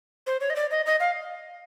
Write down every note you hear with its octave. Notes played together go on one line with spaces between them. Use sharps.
C5
C#5
D#5
D5
D#5
D#5
F5